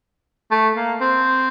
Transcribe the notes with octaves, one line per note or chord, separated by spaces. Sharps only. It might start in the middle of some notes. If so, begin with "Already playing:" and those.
A3
A#3
C4